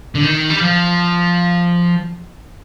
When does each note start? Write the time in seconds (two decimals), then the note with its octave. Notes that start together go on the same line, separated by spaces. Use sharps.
0.15 D3
0.23 D#3
0.50 G3
0.61 F3